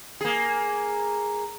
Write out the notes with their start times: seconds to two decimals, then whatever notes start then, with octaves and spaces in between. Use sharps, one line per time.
0.21 A#3 G#4